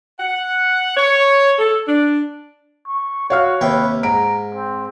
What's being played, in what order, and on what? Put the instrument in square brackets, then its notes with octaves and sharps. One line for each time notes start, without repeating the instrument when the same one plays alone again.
[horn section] F#5
C#5
A4
D4
[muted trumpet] C#6
[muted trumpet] F#4 [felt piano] C#5 F5 F6
[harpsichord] D#2 C3 G5 [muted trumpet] B4
[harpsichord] G#2 [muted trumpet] A#5 [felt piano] D7
[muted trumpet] C4